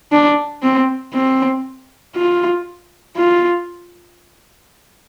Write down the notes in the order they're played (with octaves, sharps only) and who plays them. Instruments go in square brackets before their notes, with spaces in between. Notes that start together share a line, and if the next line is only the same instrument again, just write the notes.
[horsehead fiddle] D4
C4
C4
F4
F4